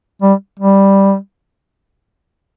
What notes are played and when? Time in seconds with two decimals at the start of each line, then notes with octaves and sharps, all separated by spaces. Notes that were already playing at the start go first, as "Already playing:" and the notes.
0.22 G3
0.60 G3